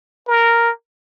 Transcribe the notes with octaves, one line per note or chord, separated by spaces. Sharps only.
A#4